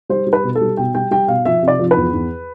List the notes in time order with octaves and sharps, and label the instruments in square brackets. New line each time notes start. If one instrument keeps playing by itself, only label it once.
[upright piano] G3 C5
G3
B4
B2
A4
G3
B2 G5
G3 G5
G3 G5
B2 F5
F3 E5
C3
D5
F3
B4
E2
E2